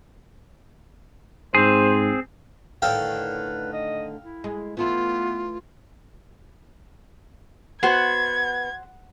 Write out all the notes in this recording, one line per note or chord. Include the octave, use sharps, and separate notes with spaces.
G#2 C4 G#4 C5
A2 D3 D#3 A4 B4 F5 G5
D#5
E4
G#3
E3 A3 B3 E4 F4
B3 F#4 C5 G#6